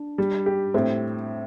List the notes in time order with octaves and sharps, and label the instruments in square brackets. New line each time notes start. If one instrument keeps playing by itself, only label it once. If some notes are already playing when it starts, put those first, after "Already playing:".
Already playing: [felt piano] D4
[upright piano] G3
G4
[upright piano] A2 [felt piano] C4